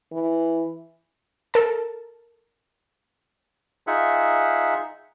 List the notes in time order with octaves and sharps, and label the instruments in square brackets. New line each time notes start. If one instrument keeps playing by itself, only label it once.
[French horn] E3
[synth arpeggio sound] A4 A#4 A5
[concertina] D#4 F4 G#4 E5 F#5